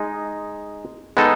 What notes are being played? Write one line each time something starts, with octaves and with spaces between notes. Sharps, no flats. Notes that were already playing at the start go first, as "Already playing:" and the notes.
Already playing: G#3 D#4
G#3 B3 D#4 A4